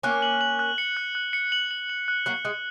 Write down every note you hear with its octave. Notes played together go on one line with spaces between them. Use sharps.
A#3 C#4 F#6
F#7
F#7
F#6
C#7
F#6
F#6
C#7
F#7
F#7
F#7
F#6
F#3 A#3 F#6
G#3 F#6